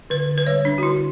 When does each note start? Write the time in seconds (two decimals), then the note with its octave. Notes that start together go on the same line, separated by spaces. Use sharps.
0.10 D3 B4
0.29 D3
0.38 B4
0.47 G3 C#5
0.65 D4
0.78 F#4
0.83 D3 E4